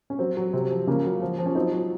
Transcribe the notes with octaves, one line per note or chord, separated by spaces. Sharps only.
C#4
F#3 C4
F#3
C3
F3
C#3 A#3 C#4
F#3
F3
F3
C#4
F#3 C4 D#4
F#3